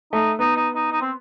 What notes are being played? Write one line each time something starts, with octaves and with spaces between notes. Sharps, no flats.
A3 D#4
B3 D#4
D#4
D#4
D#4
C4